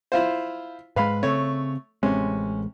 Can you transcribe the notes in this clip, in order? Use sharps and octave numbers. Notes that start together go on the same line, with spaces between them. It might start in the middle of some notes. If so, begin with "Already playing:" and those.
E4 F4 C5
G#2 G#3 B4 F5 B5
C#3 A3 C4 C#5
A1 C3 G#3 C#4